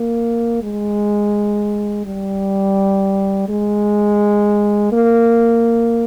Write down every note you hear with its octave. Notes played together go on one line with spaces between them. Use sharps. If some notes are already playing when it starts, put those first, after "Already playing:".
Already playing: A#3
G#3
G3
G#3
A#3